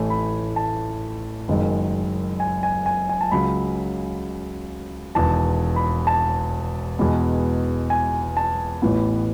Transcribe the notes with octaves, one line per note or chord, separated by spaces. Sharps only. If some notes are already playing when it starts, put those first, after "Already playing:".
Already playing: A1 A2 E3 A3 G#5
B5
A5
F#1 F#2 D#3 G#3
G#5
G#5
G#5
G#5
A5
C#2 C#3 F#3 B5
E1 E2 D#3 A5
B5
A5
E2 B2 G#3 B3
G#5
A5
A1 A2 E3 B3